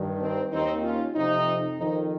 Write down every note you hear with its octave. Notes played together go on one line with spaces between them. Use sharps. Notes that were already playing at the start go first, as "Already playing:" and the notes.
Already playing: G2 D#3
C4 D#4
D#2 D#3 C4 D#4
C#4 F4
F2 C3 F3 C4 D#4
F2 D#3 C4 D#4